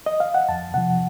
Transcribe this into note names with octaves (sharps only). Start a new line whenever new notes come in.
D#5
F5
F#5
F2 A5
C3 F3 F#5